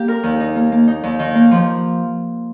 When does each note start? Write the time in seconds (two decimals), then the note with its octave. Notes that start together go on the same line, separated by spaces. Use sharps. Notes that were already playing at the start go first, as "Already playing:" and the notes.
Already playing: A#3 G4
0.08 A#4
0.23 D#2
0.40 D#4
0.56 A#3
0.72 A#3
0.88 D#4
1.03 D#2
1.19 D#3
1.35 A#3
1.51 F3